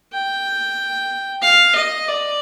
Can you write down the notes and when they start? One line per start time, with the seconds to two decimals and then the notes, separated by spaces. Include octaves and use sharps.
0.12 G5
1.42 F5
1.75 D#5
2.08 D5